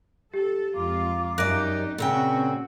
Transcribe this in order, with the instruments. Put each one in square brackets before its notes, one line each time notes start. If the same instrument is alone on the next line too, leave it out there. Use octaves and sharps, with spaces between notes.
[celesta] G4 [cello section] A4
[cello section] F2 G#3 F4 [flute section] F5 A#5 D6
[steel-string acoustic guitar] F#2 D5 [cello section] D#4 G4 [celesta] F#6 A#6 D7
[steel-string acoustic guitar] A#2 C#3 G5 [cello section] C4 C#4 F#4 [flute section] E6